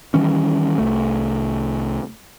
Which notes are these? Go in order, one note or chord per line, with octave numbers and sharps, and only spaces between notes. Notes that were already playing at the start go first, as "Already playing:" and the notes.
D#3 E3 G3 C#4
C2 A3